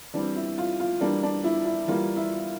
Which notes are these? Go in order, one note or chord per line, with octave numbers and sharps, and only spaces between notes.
E3 G3 C4 D4
E4
F4
F4
E3 G3 A#3 D4
D4
E4
E4
E3 G3 A#3 F4
E4